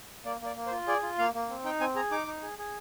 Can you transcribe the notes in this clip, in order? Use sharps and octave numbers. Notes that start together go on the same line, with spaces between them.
A#3 D5
A#3
D5
A#3
C5
F4
G#4 D5
F4
A#3 F5
A#3
C4
D#4 G5
C4 G#5
G#4 A#5
D#4 D6
D#4
G#4
G#4